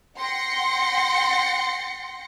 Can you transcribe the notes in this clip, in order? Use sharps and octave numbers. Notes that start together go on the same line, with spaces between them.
F#5 G5 C6 A#6 C#7